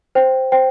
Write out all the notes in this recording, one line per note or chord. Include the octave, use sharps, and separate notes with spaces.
C5 G5
C5 G5